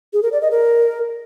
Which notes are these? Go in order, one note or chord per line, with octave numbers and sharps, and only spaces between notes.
G#4
A#4
D5
D#5
A#4